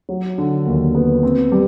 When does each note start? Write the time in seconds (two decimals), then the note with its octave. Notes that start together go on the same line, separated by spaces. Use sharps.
0.09 F#3
0.38 D3
0.66 D#2
0.95 B3
1.23 C4
1.52 G3